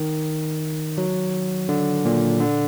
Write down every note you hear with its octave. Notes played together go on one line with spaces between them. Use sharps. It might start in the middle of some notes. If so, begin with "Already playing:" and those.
Already playing: D#3
F#3
D3
A#2
D3